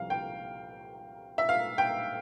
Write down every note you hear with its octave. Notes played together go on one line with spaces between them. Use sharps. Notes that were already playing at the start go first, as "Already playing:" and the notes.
Already playing: C2 C3 F3 F5
G5
E5
F5
G5